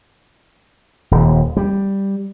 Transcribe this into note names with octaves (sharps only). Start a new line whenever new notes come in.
D#1 D#2
G3